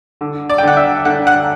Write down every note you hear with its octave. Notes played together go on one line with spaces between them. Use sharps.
D3
D5
G5
D3 F#5
E5
D3 F#5
F#5